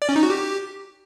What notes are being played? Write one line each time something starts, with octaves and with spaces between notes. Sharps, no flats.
D5
C#4
D#4
F#4
G4